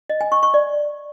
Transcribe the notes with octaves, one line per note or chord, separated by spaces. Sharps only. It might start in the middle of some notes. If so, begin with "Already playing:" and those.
D#5
G#5
C#6
C#6
D5